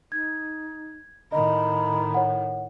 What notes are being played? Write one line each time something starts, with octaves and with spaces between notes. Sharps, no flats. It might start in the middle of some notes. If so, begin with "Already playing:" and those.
D#4 G#6
A2 D#3 D#5 A#5 B5
C#5 F#5